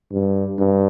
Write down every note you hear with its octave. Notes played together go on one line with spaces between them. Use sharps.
G2
G2